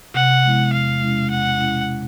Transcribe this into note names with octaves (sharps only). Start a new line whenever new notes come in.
C3 F#5
F3 G#3 B3 E4
E2 F5
B2 G#3 C#4 E4
E2 F#5
B2 G#3 C#4 E4
B2